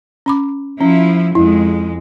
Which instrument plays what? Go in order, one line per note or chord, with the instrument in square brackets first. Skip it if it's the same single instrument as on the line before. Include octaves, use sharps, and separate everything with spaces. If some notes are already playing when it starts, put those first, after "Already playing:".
[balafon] C#4 B5 D6
[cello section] F3 E4 [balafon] C#4
[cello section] F2 G#3 [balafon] E4